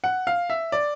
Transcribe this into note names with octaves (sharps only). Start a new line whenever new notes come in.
F#5
F5
E5
D5